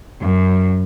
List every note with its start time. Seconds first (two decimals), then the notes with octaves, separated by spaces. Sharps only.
0.20 F#2